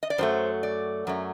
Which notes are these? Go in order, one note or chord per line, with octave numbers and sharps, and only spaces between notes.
D#5
D5
F#2 F#3 A3 C5
D5
F#2 F#3 A3